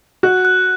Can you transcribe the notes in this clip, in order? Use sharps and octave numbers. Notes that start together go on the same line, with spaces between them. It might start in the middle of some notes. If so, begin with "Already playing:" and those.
F#4 F#6
F#6